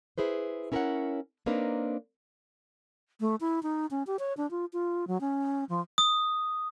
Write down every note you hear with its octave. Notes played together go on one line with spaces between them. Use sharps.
E4 G#4 B4 C5
C#4 E4 A#4 B4 C#5 F#5
A#3 C4 D4 D#4 A#4 B4
A3
E4
D#4
C#4
G4
C#5
D4
F4
F4
F#3
C#4
F3
D#6